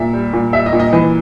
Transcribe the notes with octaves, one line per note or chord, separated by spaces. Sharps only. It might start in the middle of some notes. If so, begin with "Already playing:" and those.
Already playing: A#2 E5
G3
A#2
G3 E5
D#5
A#2
D#5
E3 B4